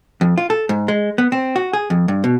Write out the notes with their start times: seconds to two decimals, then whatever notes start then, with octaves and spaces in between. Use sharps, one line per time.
0.21 F2
0.38 F4
0.50 A4
0.69 G#2
0.88 G#3
1.18 B3
1.32 C4
1.56 F#4
1.73 G#4
1.90 F2
2.08 G2
2.24 B2